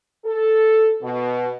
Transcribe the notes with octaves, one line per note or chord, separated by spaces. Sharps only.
A4
B2